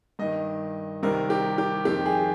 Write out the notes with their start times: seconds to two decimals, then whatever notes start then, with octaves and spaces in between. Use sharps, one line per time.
0.19 G2 D#3 D#5
1.03 C2 C3 D#3 A#4
1.30 G4
1.58 G4
1.85 F2 D#3 G4
2.06 G#4